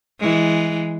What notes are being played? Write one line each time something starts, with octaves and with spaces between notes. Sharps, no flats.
E3 G#3